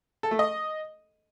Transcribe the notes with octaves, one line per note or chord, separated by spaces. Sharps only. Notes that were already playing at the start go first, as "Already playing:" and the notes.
A4
A3
D#5